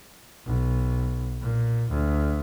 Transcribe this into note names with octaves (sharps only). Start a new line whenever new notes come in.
B1
A#2
D2